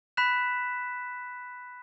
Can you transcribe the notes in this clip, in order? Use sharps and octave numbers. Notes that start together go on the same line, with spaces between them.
B5 F#6 B6 E7